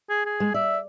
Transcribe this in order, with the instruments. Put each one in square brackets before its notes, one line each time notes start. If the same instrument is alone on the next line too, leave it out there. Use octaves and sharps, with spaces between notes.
[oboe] G#4
G#4
[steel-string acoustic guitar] G#3
[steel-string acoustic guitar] D5 [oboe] E5